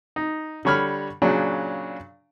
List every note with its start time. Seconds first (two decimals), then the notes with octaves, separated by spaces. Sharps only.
0.16 D#4
0.65 D3 G3 C#5 B5 F6
1.22 A#2 C#3 F#3 D4